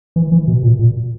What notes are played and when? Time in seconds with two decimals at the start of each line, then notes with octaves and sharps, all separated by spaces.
0.16 E3
0.32 E3
0.48 B2
0.63 A#2
0.79 A#2